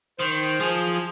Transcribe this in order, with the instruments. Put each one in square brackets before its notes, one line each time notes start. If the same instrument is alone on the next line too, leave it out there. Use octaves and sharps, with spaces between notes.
[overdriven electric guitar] D#3 [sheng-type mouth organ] C5
[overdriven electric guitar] F3 [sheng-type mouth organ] G#4